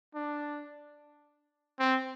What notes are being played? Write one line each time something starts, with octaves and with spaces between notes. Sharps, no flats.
D4
C4